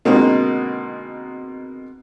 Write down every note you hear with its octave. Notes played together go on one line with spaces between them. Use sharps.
B2 D3 D#3 G#3 A#3 C4